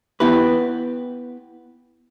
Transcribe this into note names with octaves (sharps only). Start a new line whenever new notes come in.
B3 E4 G4 B4